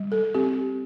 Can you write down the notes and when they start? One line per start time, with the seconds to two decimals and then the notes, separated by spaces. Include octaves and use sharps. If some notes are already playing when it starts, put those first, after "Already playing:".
Already playing: G3
0.12 A4
0.34 C4 G4